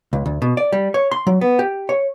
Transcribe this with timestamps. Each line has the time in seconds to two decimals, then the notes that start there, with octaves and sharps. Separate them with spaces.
0.13 C#2
0.26 D2
0.42 B2
0.57 D5
0.72 G3
0.94 C#5
1.11 C6
1.27 F#3
1.41 B3
1.59 G4
1.89 C#5